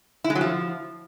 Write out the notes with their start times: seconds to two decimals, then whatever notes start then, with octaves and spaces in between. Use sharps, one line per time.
0.24 E4
0.30 G#3
0.35 F#3
0.41 F3